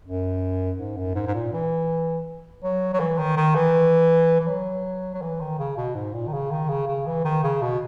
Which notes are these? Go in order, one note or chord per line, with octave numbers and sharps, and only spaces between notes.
F#2
G#2
F#2
G#2
G#2
A#2
E3
F#3
F#3
E3
D#3
D#3
E3
E3
F#3
F#3
E3
D#3
C#3
B2
G#2
A#2
D#3
C#3
D#3
C#3
C#3
E3
D#3
C#3
B2